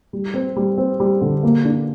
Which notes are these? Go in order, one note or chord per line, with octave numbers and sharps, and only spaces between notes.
G3
C4
G3
C4
G3
D3
A#3
D4